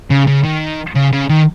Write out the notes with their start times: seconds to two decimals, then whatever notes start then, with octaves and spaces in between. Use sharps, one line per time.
0.10 C#3
0.27 C#3
0.44 D#3
0.96 C#3
1.13 C#3
1.29 D#3